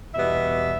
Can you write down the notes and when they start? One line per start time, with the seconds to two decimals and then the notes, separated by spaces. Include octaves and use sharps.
0.13 E2 B2 G3 B3 E5